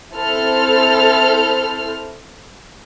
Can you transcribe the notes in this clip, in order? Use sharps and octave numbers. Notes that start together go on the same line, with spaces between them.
C4 E4 A4 C5 F6